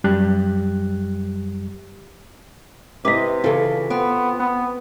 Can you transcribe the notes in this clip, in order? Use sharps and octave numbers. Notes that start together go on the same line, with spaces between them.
F#2 G3 G4 F#6
C3 E4 B4 D#5 D6 B6
C#3 E3 F4 A4
B3 C4
B3